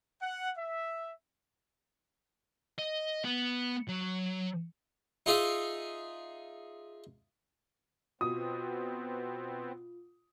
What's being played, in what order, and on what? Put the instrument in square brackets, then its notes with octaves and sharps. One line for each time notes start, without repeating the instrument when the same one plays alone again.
[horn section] F#5
E5
[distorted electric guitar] D#5
B3
F#3
[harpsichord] D#4 F4 G#4 E5
[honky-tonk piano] B2 [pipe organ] B3 C4 [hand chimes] F4 [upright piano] D#6